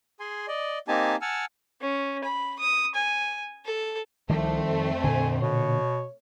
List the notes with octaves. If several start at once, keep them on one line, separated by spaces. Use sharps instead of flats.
G#4 G#5 C6
D5 D#5
A#3 C4 D#4 G4 G#5 A5
F#5 G#5 A5 E6 F6
C#4
B5
D#6
G#5
A4
C2 D#3 F3 G3 A3 C4
F2
A#2 D3 G#5
B2 C#5